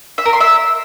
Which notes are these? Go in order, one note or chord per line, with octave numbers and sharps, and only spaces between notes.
E5
A#4
C6
E5